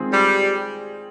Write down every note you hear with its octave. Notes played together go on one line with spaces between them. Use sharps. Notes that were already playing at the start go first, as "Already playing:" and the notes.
Already playing: D#3 G#3 C4 F4 G#4
G3